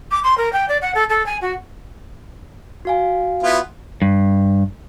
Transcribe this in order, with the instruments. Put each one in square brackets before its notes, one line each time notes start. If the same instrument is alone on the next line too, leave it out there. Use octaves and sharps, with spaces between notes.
[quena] D6
C6
A#4
G5
D5
F#5
A4
A4
G#5
F#4
[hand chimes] F#4 F5 G#5
[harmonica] B3 E4 F4
[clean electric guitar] G2